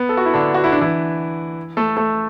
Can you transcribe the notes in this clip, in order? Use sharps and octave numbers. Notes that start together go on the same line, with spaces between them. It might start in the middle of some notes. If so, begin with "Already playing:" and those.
Already playing: B3
A4
F#4
E4
D3 D4
F#4
E4
D4
E3 E4
A3 A4
A3 A4